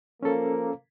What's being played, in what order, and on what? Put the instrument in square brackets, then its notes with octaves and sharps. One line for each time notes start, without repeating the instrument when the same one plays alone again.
[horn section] F3 A#3 [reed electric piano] C#4 A4